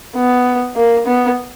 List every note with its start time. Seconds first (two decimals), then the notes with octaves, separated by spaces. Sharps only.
0.16 B3
0.76 A#3
1.07 B3